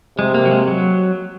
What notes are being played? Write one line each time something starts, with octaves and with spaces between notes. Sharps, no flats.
C3 G#3
A#3
F#3
G#3
F#3